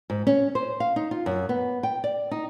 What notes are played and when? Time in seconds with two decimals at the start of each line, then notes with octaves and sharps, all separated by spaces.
0.10 G#2
0.27 C#4
0.55 C5
0.80 F5
0.96 D#4
1.11 F4
1.26 F#2
1.49 B3
1.83 G5
2.04 D5
2.31 D#4